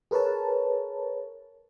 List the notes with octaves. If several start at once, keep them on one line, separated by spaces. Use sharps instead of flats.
G#4 A#4 B4 C#5 A5